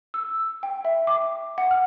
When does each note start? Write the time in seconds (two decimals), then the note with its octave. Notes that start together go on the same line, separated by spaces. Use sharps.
0.14 E6
0.63 G5
0.85 E5
1.07 D6
1.58 F#5
1.71 F6